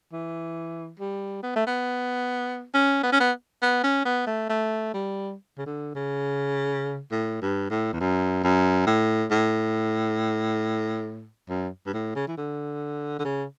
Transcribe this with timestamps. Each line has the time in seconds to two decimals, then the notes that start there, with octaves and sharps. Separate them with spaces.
0.12 E3
1.00 G3
1.43 B3
1.56 A3
1.67 B3
2.74 C#4
3.03 B3
3.12 C#4
3.20 B3
3.62 B3
3.84 C#4
4.05 B3
4.27 A3
4.50 A3
4.94 G3
5.58 C#3
5.66 D3
5.95 C#3
7.11 A2
7.42 G2
7.71 A2
7.93 E2
8.00 F#2
8.44 F#2
8.87 A2
9.31 A2
11.49 F#2
11.86 G2
11.93 A2
12.16 C#3
12.28 E3
12.37 D3
13.19 D3
13.25 C#3